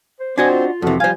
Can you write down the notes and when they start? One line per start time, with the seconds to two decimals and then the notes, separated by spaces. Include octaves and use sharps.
0.20 C5
0.38 C4 D4 F#4 C5 D#5 G#5
0.50 F4
0.82 F2 C3 E3 F#4 A4
1.00 F3 G3 C5 F5 G#5